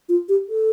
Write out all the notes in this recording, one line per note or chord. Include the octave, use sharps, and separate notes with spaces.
F4
G4
A4